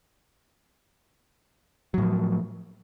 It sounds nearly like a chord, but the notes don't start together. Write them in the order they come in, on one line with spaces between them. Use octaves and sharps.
F#3 A2 F3